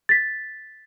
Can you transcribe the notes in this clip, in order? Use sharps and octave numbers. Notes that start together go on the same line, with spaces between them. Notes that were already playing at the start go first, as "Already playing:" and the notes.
A6 B6